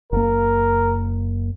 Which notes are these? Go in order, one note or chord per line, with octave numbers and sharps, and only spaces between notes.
F#1 A#3 A#4